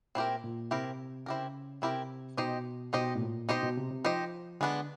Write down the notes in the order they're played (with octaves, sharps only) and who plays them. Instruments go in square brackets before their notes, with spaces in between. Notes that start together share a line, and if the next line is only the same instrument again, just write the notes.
[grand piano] A#2 [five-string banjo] C4 E4 G4 A#4
[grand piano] A#2
[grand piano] C3 [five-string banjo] C4 E4 G4 A#4
[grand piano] C#3 [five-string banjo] C4 E4 G4 A#4
[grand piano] C3 [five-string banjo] C4 E4 G4 A#4
[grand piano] B2 [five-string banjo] D#4 G4 C5 D#5
[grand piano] B2 [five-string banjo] D#4 G4 C5 D#5
[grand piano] A2
A#2
[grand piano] B2 [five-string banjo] D#4 G4 C5 D#5
[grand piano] B2
C3
C3
[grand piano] F3 [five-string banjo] D#4 G4 C5 D#5
[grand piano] D3 [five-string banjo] G#3 B3 D4